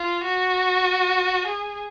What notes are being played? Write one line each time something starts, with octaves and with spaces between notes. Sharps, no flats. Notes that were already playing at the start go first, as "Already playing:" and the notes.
Already playing: F4
F#4
G#4